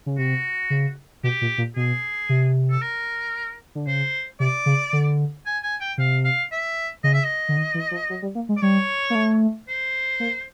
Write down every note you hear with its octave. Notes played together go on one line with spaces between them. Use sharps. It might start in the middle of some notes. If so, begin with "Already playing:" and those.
C#3
C3 F#4
C#3
B2 G4
A#2
A#2
B2 G#4
C3
A4
A#4
D3
C#3 C5
C3 D5
C#3
D3
G#5
G#5
G5
C3 F5
F5
E5
C#3 D#5
E5
D#5
D3
D#3
E3
F3
F#3
G3
A#3
G#3
D5
G3 C#5
A#3
A3
C5
A#3